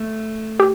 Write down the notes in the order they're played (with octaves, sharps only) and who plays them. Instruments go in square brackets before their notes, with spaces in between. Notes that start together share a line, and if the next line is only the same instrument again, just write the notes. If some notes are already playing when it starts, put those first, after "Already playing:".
Already playing: [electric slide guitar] A3
[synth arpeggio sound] G4